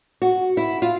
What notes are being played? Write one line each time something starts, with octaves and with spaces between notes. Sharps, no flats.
F#4
E4
F4